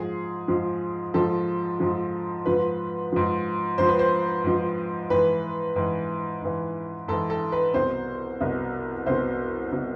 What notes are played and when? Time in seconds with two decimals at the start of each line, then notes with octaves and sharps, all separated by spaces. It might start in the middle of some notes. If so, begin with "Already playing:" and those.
Already playing: G#2 F3 G#4
0.48 G#2 F3
1.14 G#2 F3 A4
1.80 G#2 F3
2.46 G#2 F3 B4
3.12 G#2 F3
3.78 G#2 F3 C5
3.89 B4
3.99 C5
4.44 G#2 F3
5.10 G#2 E3 B4
5.76 G#2 E3
6.42 G#2 E3
7.08 G#2 E3 A4
7.30 A4
7.52 B4
7.74 C2 B2 C5
8.40 C2 B2
9.06 C2 B2 C5
9.72 B2